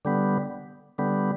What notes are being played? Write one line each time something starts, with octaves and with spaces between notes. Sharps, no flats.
D3 G3 B3
D3 G3 B3